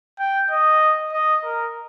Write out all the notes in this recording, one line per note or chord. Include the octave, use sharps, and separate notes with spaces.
G5
D#5
D#5
A#4